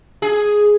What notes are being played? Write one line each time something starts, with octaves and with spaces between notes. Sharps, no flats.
G#4